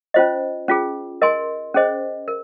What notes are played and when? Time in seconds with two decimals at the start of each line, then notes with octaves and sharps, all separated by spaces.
0.14 C#4 F4 C5 D#5
0.68 C#4 F4 G#4
1.22 A#4 D#5 G#5 C6
1.74 C#4 G#4 C5 D#5
2.28 A#4